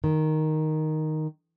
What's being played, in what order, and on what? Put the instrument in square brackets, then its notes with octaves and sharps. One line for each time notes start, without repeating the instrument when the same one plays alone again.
[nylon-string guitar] D#3